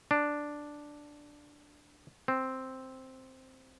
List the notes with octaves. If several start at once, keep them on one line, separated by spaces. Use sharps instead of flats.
D4
C4